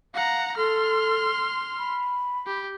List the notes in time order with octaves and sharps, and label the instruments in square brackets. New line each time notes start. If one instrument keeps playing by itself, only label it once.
[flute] F5 [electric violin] F#5 A#5
[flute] A4 [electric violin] C6 F6
[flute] B5
[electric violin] G4